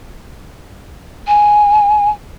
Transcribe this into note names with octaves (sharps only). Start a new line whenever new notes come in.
G#5